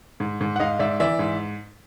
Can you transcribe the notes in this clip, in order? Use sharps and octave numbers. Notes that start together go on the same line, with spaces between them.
G#2
G#2
F#5
G#2 D#5 F5
G#2 D5 E5
E3 D5 E5
G#2